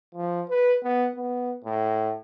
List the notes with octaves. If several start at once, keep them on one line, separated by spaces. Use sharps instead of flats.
F3
B4
B3
B3
A2